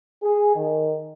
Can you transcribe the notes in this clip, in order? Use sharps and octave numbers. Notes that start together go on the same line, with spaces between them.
G#4
D#3